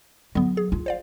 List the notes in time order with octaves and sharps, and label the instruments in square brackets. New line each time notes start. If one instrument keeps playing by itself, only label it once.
[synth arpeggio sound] D3 B3 [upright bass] F#3
[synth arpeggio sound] G#4
[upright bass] F4
[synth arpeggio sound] C5 D5 F5